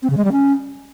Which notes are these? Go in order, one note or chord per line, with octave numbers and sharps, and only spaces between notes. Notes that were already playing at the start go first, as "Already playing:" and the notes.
C4
C#3
G#3
G3
C#4